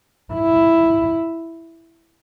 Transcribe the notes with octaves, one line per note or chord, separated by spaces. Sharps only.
E4